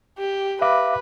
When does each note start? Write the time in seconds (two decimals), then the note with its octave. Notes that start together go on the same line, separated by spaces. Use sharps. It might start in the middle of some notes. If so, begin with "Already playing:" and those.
0.18 G4
0.61 B4 E5 F5 D6